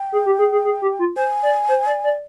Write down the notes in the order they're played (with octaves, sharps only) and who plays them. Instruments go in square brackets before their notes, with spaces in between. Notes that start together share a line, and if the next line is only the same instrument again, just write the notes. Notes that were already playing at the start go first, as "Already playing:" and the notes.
Already playing: [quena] G5
[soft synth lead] G#4
G4
G#4
G#4
G#4
G4
F4
[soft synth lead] C5 [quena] G#5
[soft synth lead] D5
C5
D5
D5